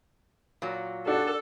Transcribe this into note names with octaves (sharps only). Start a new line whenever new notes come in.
A#2 F#3
D4 F#4 G4 A4